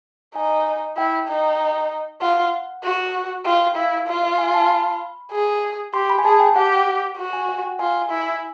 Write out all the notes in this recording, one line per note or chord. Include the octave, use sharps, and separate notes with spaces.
D#4 G#5
E4 G5
D#4
F4 F#5
F#4
F4 G5
E4 F5
F4
E5
G#5
A5
B5
G#4
G4 C6
B5
G#5
G#4 A5
G5
G4 F#5
F#4
G#5
F#5
G5
F4 G#5
E4